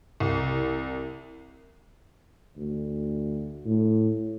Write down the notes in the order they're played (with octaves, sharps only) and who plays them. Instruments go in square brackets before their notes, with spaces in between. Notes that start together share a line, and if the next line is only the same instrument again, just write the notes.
[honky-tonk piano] C2
[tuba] D2
A2